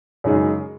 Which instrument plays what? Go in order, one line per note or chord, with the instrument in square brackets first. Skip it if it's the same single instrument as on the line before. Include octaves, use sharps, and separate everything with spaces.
[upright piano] F#2 C#3 G#3 D#4 G#4